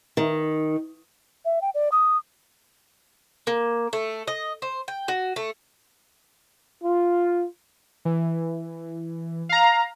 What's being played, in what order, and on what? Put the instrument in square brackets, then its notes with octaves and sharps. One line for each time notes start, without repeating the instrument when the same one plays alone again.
[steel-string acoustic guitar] D#3
[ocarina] E5
G5
D5
D#6
[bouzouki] A#3
A3
D#5
C5
G5
F#4
A3
[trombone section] F4
[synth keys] E3
F5 A#5